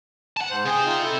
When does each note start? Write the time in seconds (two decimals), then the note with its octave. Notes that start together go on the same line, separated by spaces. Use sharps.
0.37 F#5 A5
0.50 G#2 C5
0.65 C3 G#4 G5
0.85 D#4 F4
1.03 E4 A4